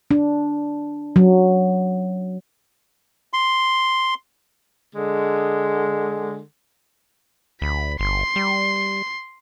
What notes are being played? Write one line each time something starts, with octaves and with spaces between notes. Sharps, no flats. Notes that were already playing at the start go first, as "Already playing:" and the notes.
D4
F#3
C6
D3 G#3
D2 B5
G1 C6
G3